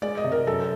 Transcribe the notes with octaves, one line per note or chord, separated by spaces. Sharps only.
G#3 D5
D#5
C3
A#4
F#2 A4